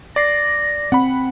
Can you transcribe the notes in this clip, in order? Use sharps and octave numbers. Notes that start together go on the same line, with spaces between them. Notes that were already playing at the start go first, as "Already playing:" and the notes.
D5 A#6 C7
C4 F#5 B5